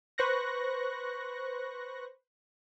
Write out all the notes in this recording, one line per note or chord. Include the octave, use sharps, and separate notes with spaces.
B4 C5 C#6 F#6 A#6